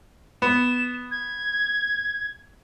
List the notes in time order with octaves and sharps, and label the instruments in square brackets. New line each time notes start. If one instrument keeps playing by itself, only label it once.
[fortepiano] B3 [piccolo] E7
[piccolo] G#6